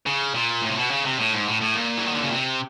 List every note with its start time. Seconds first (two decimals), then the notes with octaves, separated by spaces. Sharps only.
0.06 C#3
0.35 A#2
0.62 A2
0.70 C3
0.77 B2
0.90 C#3
1.05 C3
1.19 A2
1.33 G#2
1.47 A2
1.61 A2
1.75 A#2
1.98 E3
2.06 D#3
2.15 D3
2.23 C#3
2.31 C3